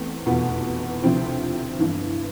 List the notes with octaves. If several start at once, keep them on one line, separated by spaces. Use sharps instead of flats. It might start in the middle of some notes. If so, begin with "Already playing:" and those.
Already playing: E2 A3 C4
F1 E2 B2 B3 F4
D2 C3 F3 C4 E4
G1 G2 E3